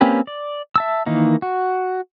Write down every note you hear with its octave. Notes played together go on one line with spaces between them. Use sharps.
A#3 C4 C#4 G4 B4
D5
E5 A5 E6
D#3 E3 A#3 D#4
F#4